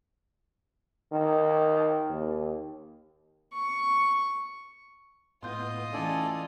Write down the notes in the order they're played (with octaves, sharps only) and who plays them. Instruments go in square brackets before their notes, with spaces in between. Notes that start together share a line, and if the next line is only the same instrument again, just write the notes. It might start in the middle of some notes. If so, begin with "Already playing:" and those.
[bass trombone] D#3
D#2
[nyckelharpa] C#6
[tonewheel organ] A2 B3 [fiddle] F4 D#5 [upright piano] C6 G6
[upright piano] C#3 E3 [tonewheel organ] A3 [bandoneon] A4 D5 G#5